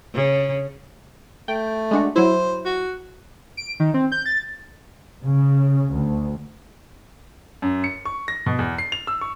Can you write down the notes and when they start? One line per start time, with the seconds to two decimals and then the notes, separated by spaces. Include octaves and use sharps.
0.15 C#3
1.48 A3 G5
1.91 G#3 D4 F#4
2.16 F#3 E4 C5
2.65 F#4
3.57 D7
3.80 D#3
3.94 C4
4.12 G6
4.26 A6
5.24 C#3
5.93 D2
7.62 F#2
7.84 C#7
8.05 C#6
8.28 A#6
8.46 B2
8.59 E2
8.78 C7
8.92 F7
9.07 E6
9.21 C#6